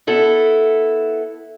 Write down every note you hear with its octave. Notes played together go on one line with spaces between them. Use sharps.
B3 E4 A4